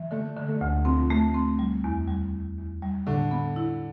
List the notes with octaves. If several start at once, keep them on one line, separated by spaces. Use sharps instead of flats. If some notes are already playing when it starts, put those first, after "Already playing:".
Already playing: E3
D3 A3
D3
A3
D2
F3 C4
A3
C4
G3
E2
G3
E2
E2
G3
A2 D3
B3
E4